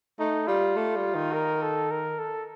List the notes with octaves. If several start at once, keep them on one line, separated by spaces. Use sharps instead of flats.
A3 D#4
G3 F4
A3
G3
D#3
A#4
A4
A#4
A4